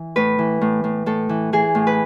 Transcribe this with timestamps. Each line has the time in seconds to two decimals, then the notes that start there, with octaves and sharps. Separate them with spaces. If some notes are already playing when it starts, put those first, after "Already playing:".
Already playing: E3
0.16 A2 B4
0.39 E3
0.61 A2
0.84 A2
1.06 A2 A4
1.29 E3
1.53 E3 G#4
1.75 A2
1.87 B4